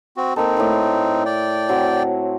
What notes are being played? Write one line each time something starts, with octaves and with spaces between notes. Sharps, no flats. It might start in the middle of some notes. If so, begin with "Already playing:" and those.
C4 F#4
A#3 C4 D#4 A4
A2 B5
D5 G5
F#3 C4